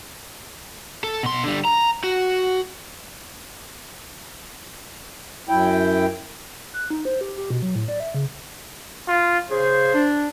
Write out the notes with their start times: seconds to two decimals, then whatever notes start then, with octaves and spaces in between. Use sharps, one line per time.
1.04 A4
1.23 B2 C6
1.44 D3 G3
1.65 A#5
2.04 F#4
5.49 F#2 E4 G5
6.74 F#6
6.90 D#4
7.05 C5
7.21 G4
7.37 G4
7.50 B2
7.62 F#3
7.75 A2
7.88 D5
8.00 E5
8.14 C#3
9.08 F4
9.50 C#3 G#4 C5
9.94 D4